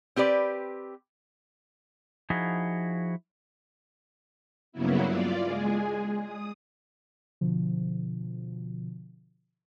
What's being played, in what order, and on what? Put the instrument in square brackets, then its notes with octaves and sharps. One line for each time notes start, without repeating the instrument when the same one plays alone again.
[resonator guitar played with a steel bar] C4 G4 B4 D5
[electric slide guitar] F3 D#4 E4 F#4 G#4
[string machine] G2 C#3 F#3 A#3 B3 E4
F4 D5
G#3 G#4
D#6
[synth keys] B2 D3 F3